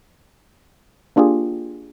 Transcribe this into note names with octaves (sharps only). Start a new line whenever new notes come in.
A#3 D4 F4 G4 G#4